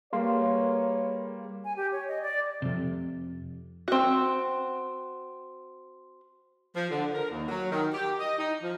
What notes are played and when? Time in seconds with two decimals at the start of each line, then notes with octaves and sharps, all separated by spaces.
0.13 G3 A#3 G#4 A#4 B4 C#5 F5 C6
1.64 G#5
1.77 G4
1.92 C#5
2.08 D#5
2.22 D5
2.62 F2 C3
3.88 C4 F#4
6.76 F3
6.91 D3
7.14 A#4
7.31 D#2
7.48 F#3
7.72 D#3
7.93 G4
8.18 D#5
8.39 D#4
8.62 F3